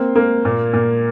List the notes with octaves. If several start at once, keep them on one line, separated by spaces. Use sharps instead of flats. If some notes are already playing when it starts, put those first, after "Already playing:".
Already playing: A#3 C4
A#3
A#2
A#2